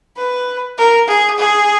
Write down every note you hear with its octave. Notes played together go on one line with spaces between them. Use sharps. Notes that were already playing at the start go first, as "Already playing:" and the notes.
B4
A#4
G#4
G#4